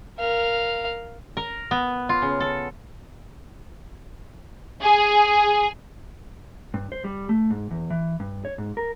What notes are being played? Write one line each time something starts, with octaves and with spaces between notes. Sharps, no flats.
A#4 F5
A#4
B3
F4
C#3
A4
G#4
G2
C5
G3
A3
G#2
E2
E3
G2
C#5
G#2
A#4